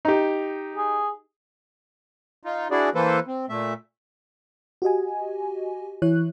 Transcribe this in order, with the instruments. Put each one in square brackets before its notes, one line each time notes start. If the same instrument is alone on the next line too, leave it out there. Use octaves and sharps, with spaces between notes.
[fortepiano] D#4 G4
[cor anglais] G#4
[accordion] D#4 F4
D4 E4 F#4 G#4 D5
E3 A#3 A4 B4 C5
C4
A#2 A3 E5
[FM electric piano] F#4 G4 D#5 G#5
E3 E4 C#5 F#6